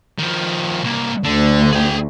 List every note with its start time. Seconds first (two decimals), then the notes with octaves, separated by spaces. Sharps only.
0.18 D#3 F3
0.83 C2 A#3
1.24 D2 D3
1.72 G#4 G5